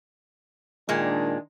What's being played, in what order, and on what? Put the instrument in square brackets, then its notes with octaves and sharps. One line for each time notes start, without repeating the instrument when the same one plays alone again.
[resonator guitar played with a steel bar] A#2 G#3 [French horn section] D#3 D4